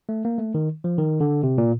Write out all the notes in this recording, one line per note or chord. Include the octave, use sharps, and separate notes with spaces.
A3
A#3
A3
D#3
F3
D#3
D3
C3
A#2